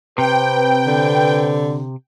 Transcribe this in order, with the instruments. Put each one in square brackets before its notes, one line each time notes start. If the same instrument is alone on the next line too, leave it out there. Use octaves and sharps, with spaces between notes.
[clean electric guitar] C3 [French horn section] C4 B4 [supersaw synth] G5
[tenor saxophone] D3